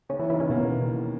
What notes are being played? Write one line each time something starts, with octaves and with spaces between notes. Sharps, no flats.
D#2 C#3 C#4
E3 E4
D#3 E3 E4
C#3 C#4
B2 A#3 B3
D#2
D#2